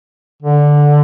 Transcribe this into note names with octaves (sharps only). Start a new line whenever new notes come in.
D3